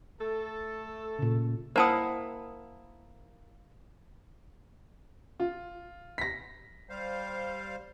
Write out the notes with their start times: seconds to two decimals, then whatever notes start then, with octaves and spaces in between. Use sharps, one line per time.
0.20 A3 A4
1.19 A#2 C#3
1.76 A#3 E4 C5 F#5 A5 D#6
5.40 F4
6.18 A#6 B6
6.89 G3 C5 F5